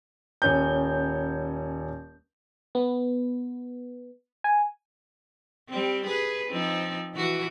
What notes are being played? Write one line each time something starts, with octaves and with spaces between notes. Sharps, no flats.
D#1 C#4 G6
B3
G#5
G3 C4
G#4 B4
F3 C4 D#4
E3 F#4